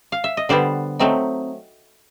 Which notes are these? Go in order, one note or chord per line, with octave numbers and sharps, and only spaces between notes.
F5
E5
D#5
D3 G3 B3 C5 D5
F#3 A3 C4 D#4